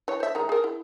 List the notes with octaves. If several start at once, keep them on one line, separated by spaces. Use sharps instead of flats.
E3 C#5
C5 E5
D#3 G#3 A#5
G#4 A#4
E4